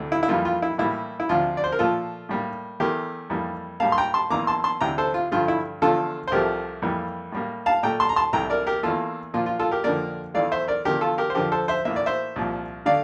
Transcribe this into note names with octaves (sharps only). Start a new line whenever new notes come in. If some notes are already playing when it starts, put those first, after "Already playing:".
Already playing: D2 C3 E3 A3
E4
E4
F2 E3 G3 A#3 F4
F4
E4
A2 E3 G3 A#3 E4
E4
D2 C3 F3 F4
D5
C5
A#4
A#2 F3 A3 F4 A4
A2 G3 A#3
E2 E3 A3 G4 A#4
F2 E3 G3 A#3
A2 G3 A#3 F5 A5
C6
G5 A#5
A5 C6
E2 E3 A#3 A#5 D6
A5 C6
A5 C6
D2 C3 E3 G5 A#5
A4 C5
F4
G2 D3 F3 A3 F4
E4
E2 D3 F3 A3 F4 A4
C5
C2 C3 F3 A3 G4 A#4
F2 E3 G3 A#3
A2 G3 A#3
F5 A5
A#2 A3 G5 A#5
A5 C6
A#5
A5 C6
C2 C3 E3 A3 G5 A#5
A#4 D5
G4 A#4
E2 E3 A#3 F4 A4
A#2 F3 A#3 F4
F4
F4 A4
G4 A#4
F2 D3 F3 A#3 A#4 D5
E2 E3 A3 D5 F5
C5 E5
A#4 D5
E2 D3 F3 G4 A#4
F4 A4
G4 A#4
C5
F2 D3 F3 G4 A#4
A4 C5
C5 E5
A2 E3 A#3 E5
D5
C5 E5
C2 A#2 F3
D3 A3 D5 F5